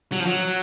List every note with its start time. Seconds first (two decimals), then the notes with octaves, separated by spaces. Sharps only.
0.12 F#3
0.20 F3
0.26 F#3